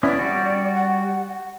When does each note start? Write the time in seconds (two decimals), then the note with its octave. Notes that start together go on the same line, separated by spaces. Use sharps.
0.03 B3 C#4 E4 D5
0.19 G3 F#4
0.75 F#5